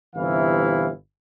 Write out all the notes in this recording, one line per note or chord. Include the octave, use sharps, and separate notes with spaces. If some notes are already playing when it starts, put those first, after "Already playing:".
G1 C3 E3 E4 F5